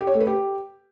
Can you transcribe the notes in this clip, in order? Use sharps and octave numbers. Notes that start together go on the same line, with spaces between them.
G4
C#5
A3
B4
G4